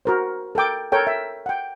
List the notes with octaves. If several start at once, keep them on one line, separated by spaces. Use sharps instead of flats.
F#4 A#4 C5
A4 A#4 G5 D6
A4 A#4 C#5 G5
E5
F#5 G5